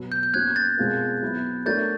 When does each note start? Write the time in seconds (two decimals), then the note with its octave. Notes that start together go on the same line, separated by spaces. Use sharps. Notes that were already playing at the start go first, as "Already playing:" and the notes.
Already playing: B2 F#3 B3
0.12 G6
0.23 G6
0.34 A#3 C#4 F#4 F#6 G#6
0.56 G6 A6
0.77 B2 G#3 C4 F4 A#4
1.22 F#3 B3 E4
1.65 A3 D4 F#4 A#4 C#5 G6 A6